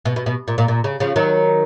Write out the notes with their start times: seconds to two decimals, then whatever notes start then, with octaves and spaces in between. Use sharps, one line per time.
0.05 B2
0.16 B2
0.26 B2
0.48 A#2
0.58 A#2
0.68 A#2
0.84 C#3
1.00 C#3 F3
1.16 D#3 F#3